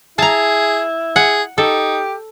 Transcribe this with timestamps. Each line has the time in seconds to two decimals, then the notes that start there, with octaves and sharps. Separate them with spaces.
0.18 E4 G#4 A5 A#5
1.16 G#4 F#5
1.58 D#4 G4 A4